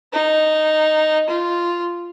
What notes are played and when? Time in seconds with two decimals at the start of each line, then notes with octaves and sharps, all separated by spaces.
0.13 D#4
1.29 F4